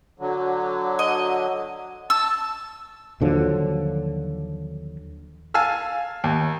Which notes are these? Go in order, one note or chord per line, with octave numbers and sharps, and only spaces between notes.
D3 F#3
D#5
A5 E6
D#2 D3 F3 F#3
F5 G#5 A5 E6 F6
D#2